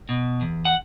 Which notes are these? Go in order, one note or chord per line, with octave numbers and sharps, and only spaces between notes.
B2
E2
F#5